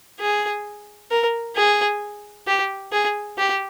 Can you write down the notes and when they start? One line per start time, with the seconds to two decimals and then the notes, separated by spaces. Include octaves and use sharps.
0.20 G#4
1.11 A#4
1.56 G#4
2.47 G4
2.92 G#4
3.38 G4